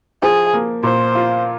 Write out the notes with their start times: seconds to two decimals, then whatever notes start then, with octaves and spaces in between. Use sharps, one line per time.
0.22 F3 G#4
0.53 A#3
0.83 A#2 C5
1.15 F4